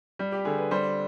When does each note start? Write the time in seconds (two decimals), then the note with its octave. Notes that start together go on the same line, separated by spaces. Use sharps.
0.19 G3
0.32 G4
0.45 D3 G#4
0.58 B4
0.71 G3 C5